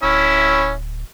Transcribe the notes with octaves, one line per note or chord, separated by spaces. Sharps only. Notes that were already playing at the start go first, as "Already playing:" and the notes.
D1 C#4 E4 E5